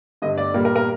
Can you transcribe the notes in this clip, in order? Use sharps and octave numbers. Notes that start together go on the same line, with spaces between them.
G2 D3 A3 D#5
D5
A#2 G3 A#3 A#4
A#4
A#4